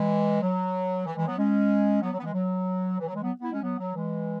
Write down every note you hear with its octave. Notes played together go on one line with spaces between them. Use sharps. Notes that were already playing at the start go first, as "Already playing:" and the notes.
Already playing: E3 G#3
F#3
E3
E3 G#3
F#3 B3
G#3 C#4
F#3 B3
F#3
B3
E3 G#3
F#3
E3
F#3
E3 G#3
F#3 B3
B3 E4
G#3 C#4
F#3 B3
F#3
E3 G#3